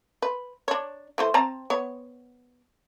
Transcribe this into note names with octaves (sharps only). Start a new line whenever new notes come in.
B4
D4 C#5
E3 A3 C5
C4 A5 A#5
B3 C#5